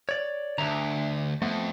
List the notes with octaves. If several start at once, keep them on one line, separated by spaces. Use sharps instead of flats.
C#5 D5
D2 D4 E5 A#5
F2 A3 B3